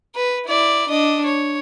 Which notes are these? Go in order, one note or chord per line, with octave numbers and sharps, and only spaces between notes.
B4
E4 D5
D4 D#5
C#5